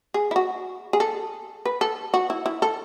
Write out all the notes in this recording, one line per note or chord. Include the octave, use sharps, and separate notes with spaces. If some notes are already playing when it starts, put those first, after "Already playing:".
G#4
E4
F#4
G#4
A4
B4
A4
F#4
E4
E4
A4